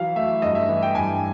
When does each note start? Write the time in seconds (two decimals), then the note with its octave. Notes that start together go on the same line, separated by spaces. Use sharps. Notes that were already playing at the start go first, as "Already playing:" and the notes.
Already playing: E3 F#3 F5
0.16 A3 E5
0.42 G2 D#5
0.55 E5
0.69 E3
0.82 G5
0.95 G2 G#5